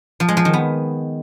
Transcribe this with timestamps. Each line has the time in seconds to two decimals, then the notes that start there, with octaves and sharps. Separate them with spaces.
0.20 F3
0.28 G#3
0.37 F3
0.45 D#3
0.54 B3